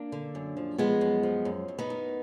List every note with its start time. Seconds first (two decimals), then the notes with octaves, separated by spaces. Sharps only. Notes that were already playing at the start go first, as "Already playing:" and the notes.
Already playing: A#3 D4
0.12 D3
0.35 F#2
0.57 F3
0.78 F3 G#3 B3
1.01 F#2
1.23 F3
1.45 F#2
1.68 F#2
1.79 B3 D#4
1.90 D#3